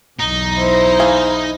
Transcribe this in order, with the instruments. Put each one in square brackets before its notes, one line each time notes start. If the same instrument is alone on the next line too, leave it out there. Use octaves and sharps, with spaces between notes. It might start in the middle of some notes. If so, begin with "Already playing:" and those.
[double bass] B1 E2 [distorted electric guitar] D#4
[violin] E4 C5
[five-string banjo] E3 G#4 F5